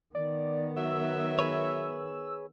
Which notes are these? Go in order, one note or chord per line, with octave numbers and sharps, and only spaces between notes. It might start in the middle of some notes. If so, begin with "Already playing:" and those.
D#3 B3 D5
F#3 E5 E6
G#4 B4 C#5